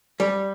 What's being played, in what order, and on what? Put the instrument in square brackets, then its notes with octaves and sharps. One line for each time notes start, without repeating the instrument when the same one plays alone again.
[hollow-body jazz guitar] G3